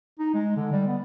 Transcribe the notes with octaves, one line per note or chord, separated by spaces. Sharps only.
D#4
G#3
D3
G3
B3